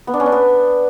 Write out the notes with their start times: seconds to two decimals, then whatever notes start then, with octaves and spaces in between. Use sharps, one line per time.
0.07 B3
0.14 D4
0.20 C#4
0.26 D4
0.32 B3